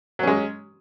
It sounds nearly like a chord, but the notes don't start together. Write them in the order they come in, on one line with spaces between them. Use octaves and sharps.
F#3 C#4 G#3